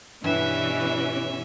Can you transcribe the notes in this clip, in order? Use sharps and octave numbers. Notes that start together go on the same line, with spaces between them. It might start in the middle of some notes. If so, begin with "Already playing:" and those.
G2 B2 E3 C#4 B4 E5